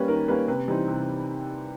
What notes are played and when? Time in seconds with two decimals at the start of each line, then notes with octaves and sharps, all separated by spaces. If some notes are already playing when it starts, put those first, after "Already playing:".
Already playing: G3 A#3 C#4 B4
0.08 D#3 A#4
0.28 G3 A#3 C#4 B4
0.48 C3 B4
0.68 E3 G3 C4 D#4
0.88 C3